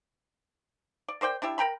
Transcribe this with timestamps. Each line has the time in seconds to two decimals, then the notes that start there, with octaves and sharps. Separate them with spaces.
1.08 D5
1.21 A#4 C5 D5 G5
1.42 D4 E4 G4 E5
1.58 A#4 G5 A#5 B5